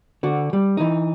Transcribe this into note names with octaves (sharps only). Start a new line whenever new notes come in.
D3 F#4
G3
E3 D#4